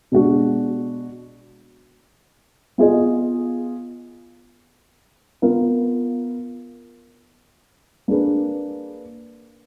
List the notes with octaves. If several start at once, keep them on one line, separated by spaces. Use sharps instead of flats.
B2 G#3 D4 F#4
B3 F4 G#4 D#5
B3 F4 A#4 F5
A#3 D4 G#4 B4